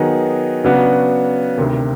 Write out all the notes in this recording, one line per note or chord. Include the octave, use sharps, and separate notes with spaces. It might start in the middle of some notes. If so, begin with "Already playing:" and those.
Already playing: D#3 F#3 B3 D#4 G#4
C#3 F#3 B3 D4 F#4
D2 C3 D#3